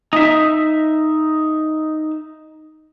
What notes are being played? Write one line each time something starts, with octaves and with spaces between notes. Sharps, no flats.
D#4 E5